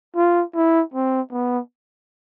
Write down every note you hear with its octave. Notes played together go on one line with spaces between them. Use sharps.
F4
E4
C4
B3